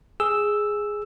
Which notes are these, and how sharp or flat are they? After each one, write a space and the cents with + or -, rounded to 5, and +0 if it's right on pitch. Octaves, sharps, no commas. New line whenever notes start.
G#4 +0 E6 +0